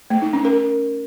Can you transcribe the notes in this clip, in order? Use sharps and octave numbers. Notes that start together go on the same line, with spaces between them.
A3
D#4
C#4
A#4